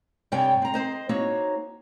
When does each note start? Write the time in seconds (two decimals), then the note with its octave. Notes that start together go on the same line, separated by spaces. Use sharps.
0.32 G2 C3 G3 C#5 G5 G#5
0.62 C4 A#5
0.74 C4 C5 D#5
1.09 A#3 C4 D#4 F#4 C#5